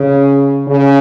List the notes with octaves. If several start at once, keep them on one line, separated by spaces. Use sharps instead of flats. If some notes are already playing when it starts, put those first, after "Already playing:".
Already playing: C#3
C#3